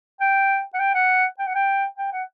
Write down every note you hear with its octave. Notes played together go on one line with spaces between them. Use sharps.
G5
F#5
G5
F#5
G5
F#5
G5
G5
F#5